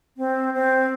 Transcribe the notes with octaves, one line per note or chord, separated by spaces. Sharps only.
C4
C4